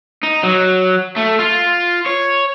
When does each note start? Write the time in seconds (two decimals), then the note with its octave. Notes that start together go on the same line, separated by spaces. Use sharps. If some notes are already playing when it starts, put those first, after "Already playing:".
0.23 D#4
0.43 F#3
1.16 A3
1.39 F4
2.06 C#5